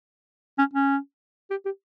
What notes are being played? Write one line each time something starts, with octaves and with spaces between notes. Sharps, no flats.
C#4
C#4
G4
G4